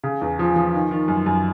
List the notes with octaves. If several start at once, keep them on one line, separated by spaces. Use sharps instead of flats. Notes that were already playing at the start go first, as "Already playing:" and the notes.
C#3
E2
F3
F3
D#3
D#3
F#2
F#2